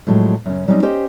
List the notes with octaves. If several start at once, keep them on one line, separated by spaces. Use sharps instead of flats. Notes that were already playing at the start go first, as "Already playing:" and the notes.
A2 F3 F#3 G#3
F#2 C#3 C#4
F#3 G3 C4 C#4 D#4
C#4 G4 C5 D#5